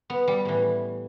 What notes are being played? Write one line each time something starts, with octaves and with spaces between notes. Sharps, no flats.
B3
G3
A2 E3